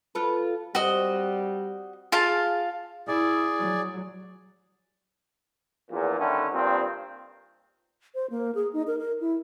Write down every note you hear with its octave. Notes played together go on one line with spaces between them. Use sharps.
F4 A4 B4
G3 C4 F#4 D#5
F4 G#4 F5 A5
E4 G#4 D5
F#3
A#1 E2 A#2
D3 D#3 G3 A3 C#4
G2 A#2 D#3 C4
C5
A#3
G#4
D#4
A#4
A#4
E4